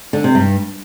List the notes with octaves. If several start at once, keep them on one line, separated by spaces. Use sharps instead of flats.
D3
C3
G2